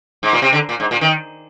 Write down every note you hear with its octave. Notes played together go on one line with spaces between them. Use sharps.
G#2
A#2
C3
D3
A#2
G#2
A#2
D#3